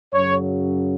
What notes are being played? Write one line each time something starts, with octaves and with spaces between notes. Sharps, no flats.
F#2 C#3 F#3 C#5